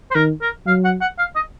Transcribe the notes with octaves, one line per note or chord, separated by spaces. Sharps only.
C5
D#3 A#4
A#4
F#3 F5
F#5
F#5
F5
D#5